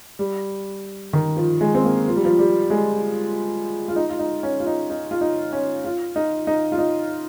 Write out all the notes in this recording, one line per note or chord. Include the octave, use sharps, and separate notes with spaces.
G3
D#3
F3
G#3
C4
A#3
F3
G3
F3
G3
G#3
F4
D#4
F4
D#4
C#4
F4
D#4
D#4
F4
D#4
C#4
F4
D#4
D#4
F4
D#4